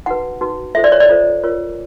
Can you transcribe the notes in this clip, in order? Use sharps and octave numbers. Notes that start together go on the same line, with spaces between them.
D#4 F#4 B4 F#5
D#4 F#4 B4
F4 A4 C5 E5
D5
C#5
D5
F4 A4 C5
F4 A#4 C#5